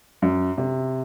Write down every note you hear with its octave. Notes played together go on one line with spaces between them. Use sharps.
F#2
C3